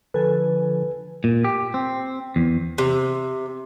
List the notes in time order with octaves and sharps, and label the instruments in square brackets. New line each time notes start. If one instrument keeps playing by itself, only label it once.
[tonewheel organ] D3 F3 [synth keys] A4 G#5 [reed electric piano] B4
[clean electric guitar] A#2
G4
C4
E2
[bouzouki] C3